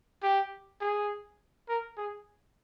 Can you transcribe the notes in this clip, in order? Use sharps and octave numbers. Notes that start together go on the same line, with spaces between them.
G4
G#4
A#4
G#4